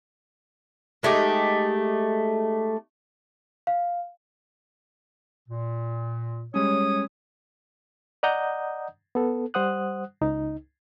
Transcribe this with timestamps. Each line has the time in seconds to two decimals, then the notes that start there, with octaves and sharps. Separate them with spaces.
1.03 G#3 A3 D#4 G4
3.67 F5
5.49 A#2
6.54 G3 G#3 C#4 C#5 D#6
8.23 D5 D#5 F#5 A#5 D#6 G6
9.15 B3 A4
9.54 G3 C5 F#5 D#6 F#6
10.21 C#2 D#4